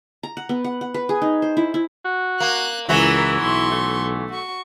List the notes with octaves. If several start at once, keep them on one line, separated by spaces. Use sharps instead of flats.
A#5
F#5
B3
F#5
F#5
B4
G#4
D#4
C5
E4
E4
F#4
A#3 F#6
C#2 E3 F#3 E4 F#4 A#4
B1 C6 C#6
A3
F#4 C#6